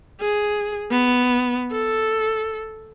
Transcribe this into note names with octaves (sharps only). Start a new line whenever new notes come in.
G#4
B3
A4